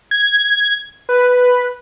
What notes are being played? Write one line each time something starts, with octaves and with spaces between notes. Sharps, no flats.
G#6
B4